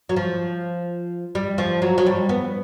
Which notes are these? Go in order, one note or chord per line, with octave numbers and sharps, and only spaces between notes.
F#3
F3
G3
F3
F#3
F#3
G3
B3